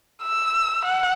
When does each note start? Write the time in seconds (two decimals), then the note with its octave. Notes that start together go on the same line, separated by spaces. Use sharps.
0.23 E6
0.85 F#5